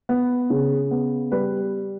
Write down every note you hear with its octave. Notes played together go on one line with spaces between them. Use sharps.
B3
C#3
B3
G3 B4